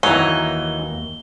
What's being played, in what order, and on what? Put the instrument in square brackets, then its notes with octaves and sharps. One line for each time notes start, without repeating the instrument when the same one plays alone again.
[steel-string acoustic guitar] D#2 A#3 [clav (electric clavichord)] E3 F#3 [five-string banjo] D#4 [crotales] G7